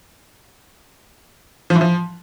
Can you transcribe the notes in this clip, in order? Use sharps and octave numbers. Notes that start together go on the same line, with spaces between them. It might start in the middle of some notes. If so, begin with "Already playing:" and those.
F3
E3
F3